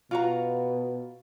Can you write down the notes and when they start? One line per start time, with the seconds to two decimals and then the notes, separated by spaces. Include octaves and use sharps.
0.11 B2 F4 F#4 A#5